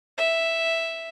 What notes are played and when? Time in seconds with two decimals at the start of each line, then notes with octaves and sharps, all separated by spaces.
0.18 E5